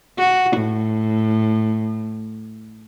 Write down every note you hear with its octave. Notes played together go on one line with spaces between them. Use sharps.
F#4
A2